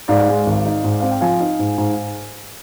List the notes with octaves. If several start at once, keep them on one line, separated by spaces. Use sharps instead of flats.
G#2 D5 F5
G#3
G#1
D#4
G#2
C4 F5
G5
F3 F5 G#5
D#4
G#2
G#2